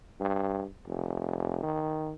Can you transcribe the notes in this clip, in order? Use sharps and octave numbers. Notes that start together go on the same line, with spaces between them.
G2
F1
D#3